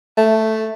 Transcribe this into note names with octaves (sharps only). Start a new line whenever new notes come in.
A3